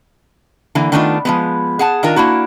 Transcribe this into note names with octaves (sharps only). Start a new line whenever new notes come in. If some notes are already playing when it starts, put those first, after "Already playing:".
D3 E3 A#3
D#3 A3 B3 D4 D#4 F4
F3 G#3 B3
G#4 F#5 A5
D#3 D4 F4 A#4 A#5
A#3 D4 E4 F#4